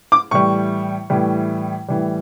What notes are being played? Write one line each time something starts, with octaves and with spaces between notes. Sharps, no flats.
D6
A2 E3 G3 C#6
A2 E3 G3
A2 E3 G3